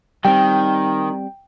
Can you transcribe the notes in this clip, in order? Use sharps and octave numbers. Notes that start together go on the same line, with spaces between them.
D#3 G3 A3 C4 G5